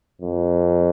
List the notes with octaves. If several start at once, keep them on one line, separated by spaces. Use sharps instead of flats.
F2